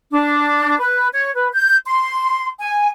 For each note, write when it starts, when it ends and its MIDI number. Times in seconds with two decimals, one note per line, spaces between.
0.11 0.77 62
0.79 1.07 71
1.12 1.34 73
1.34 1.48 71
1.53 1.75 91
1.85 2.47 84
2.59 2.88 80